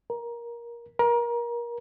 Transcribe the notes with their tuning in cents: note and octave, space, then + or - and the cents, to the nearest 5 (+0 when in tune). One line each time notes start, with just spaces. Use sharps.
A#4 +20
A#4 +30